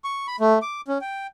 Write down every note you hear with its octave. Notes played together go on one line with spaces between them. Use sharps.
C#6
B5
A3
D6
C#4
G5